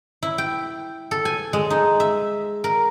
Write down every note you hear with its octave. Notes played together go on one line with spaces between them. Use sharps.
E4
G5
A4
G#5
G#3
D#4
E5
A#4